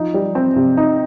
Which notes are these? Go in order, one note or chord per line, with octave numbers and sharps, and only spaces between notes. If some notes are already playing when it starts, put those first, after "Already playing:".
Already playing: F3 D#4
G3
C4
C3
D#4